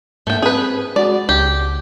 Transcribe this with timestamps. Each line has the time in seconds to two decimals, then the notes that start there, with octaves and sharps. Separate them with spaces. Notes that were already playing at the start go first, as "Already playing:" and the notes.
0.27 G#2 A3 A#3 G5 G6
0.42 C4 G#4 B4
0.96 G#3 F#4 G#4 D5
1.29 C#2 G4